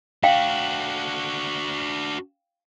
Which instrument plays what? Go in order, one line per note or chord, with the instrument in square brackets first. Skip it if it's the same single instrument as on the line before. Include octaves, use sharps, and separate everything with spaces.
[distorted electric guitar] D4 F#4 [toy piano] F5 G5